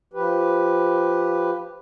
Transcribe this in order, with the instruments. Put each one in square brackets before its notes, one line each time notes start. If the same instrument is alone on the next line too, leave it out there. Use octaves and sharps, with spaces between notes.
[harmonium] F3 G4 B4